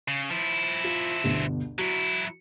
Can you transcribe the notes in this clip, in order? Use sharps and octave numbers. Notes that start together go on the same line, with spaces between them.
C#3
F3 E4
F4
G1 D2 B2
F#3 E4 F#4